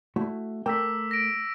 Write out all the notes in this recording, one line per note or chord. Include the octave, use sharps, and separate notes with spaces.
A3 E4 F#4
A3 A#4 G5 D6 E6 B6
A#6 D7